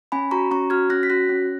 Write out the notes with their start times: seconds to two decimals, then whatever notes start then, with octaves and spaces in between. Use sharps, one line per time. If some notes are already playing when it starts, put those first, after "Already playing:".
0.12 C#4 G#5 B5
0.31 F#4 A#5 C#6
0.51 C#4 A#5 C#6
0.70 F#4 F6 G#6
0.90 C#4 F#6 A#6
1.03 B6
1.10 F#4 F#6 A#6
1.29 C#4